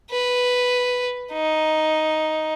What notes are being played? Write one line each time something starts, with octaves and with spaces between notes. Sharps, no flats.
B4
D#4